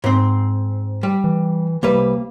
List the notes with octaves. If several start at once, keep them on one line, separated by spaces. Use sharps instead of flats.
G#2 C4
G3
E3
C2 G3 A#3 B4